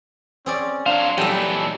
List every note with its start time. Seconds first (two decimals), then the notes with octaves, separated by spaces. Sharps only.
0.46 C4 C#4 G#4 D5
0.86 F#3 D4 C5 F5
1.18 A#2 E3 F#3 G3 D#4 G4 A4 G5